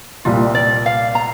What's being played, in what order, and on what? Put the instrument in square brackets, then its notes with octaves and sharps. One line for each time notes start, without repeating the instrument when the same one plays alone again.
[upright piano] C2 A#2 G3 [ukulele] F4
[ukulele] D5
F5
A#5